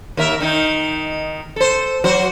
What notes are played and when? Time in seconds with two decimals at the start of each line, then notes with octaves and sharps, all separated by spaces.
0.17 D#2 A#4 E5
0.40 D#3 D#4
1.56 A4 C5
2.04 F#3 F#4 C5